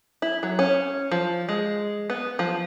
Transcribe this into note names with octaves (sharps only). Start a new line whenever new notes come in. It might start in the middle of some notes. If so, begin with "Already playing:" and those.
E4
F#3
C#4
F3
G#3
B3
F3